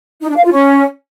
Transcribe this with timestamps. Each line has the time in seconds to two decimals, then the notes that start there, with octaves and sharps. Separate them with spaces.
0.21 D#4
0.29 D4
0.36 F5
0.44 F4
0.52 C#4